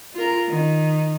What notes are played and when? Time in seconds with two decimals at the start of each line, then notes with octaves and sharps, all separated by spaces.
0.14 F4 A#4
0.48 D#3